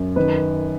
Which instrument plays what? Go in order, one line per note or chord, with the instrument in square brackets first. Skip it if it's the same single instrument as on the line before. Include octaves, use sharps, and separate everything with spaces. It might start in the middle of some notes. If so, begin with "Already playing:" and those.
Already playing: [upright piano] F#2
D#3 B4